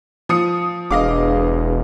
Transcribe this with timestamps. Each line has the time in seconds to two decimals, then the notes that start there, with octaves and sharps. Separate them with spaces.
0.29 F3 D#6 C#7
0.91 E1 D4 G#4 B4 D#5 F5 D6